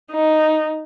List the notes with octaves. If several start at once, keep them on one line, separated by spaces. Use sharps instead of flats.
D#4